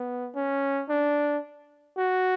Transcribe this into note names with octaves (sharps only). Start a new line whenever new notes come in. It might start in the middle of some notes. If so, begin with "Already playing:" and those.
Already playing: B3
C#4
D4
F#4